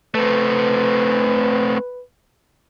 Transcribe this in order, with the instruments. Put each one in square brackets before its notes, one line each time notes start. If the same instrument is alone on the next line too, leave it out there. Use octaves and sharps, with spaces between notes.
[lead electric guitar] A3 C4 [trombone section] B4